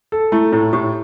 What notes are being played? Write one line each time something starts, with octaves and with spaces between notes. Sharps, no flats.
A4
A3 E4
A2 E4
A2 G4